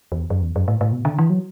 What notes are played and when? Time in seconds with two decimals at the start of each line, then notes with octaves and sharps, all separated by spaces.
0.12 E2
0.30 F#2
0.42 E2
0.56 F#2
0.68 A2
0.81 A2
0.92 B2
1.05 D3
1.19 E3
1.30 F#3